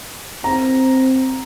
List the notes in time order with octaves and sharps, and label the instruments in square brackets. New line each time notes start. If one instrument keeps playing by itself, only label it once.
[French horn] C4 [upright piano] A#5